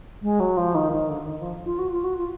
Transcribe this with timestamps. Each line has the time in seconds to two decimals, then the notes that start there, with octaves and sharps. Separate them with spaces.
0.22 G#3
0.40 F#3
0.57 F3
0.74 D#3
0.92 D#3
1.09 D3
1.26 D#3
1.40 F3
1.65 F4
1.78 F#4
1.91 F4
2.04 F#4
2.18 F4